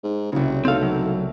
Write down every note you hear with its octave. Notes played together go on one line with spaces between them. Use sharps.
G#2
F#1 C2 C#3
B1 A3 C4 A4 F5 E6
F#3